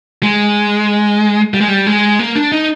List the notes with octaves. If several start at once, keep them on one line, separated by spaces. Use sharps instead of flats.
G#3
G3
G#3
G3
G#3
A#3
D4
D#4